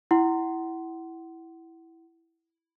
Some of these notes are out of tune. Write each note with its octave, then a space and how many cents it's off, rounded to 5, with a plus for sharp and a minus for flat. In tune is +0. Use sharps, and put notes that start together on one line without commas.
E4 +0 F#5 +25 C6 +0